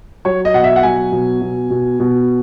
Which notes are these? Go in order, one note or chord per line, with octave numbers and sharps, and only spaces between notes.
F#3 C#5
D#5
B2 F#5
E5
F#5
F#3 G#5
B2
B2
B2
B2